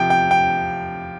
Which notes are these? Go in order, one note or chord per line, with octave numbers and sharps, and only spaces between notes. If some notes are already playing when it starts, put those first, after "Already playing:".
Already playing: C3 F3 G5
G5
G5